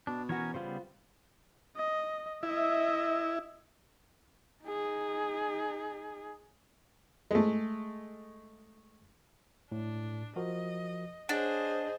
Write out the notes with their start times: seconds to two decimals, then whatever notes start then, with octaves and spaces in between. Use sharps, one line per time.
0.07 B2 D4
0.29 E3 C#4 F#4 A#4 C#5
0.54 C#3 G3 B3 F4 C5
1.76 D#5
2.43 E4 D#5 E5
4.64 D#4 G#4
7.31 G#3 A3
9.72 A2 D4
10.36 F3 F#4 A#4 D#5
11.29 D4 G#4 C5 C#5 D#5 F#5